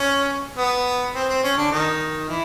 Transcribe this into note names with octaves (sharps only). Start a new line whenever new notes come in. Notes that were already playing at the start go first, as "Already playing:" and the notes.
Already playing: C#4
B3
C4
C4
C#4
D3 D4
D#3 D#4
E3 E4